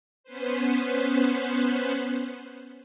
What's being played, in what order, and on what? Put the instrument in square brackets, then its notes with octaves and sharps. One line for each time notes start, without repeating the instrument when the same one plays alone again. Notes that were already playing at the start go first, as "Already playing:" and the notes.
[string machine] B3 C#4 B4 C5